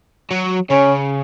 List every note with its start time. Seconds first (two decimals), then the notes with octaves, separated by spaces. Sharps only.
0.31 F#3
0.70 C#3 C#4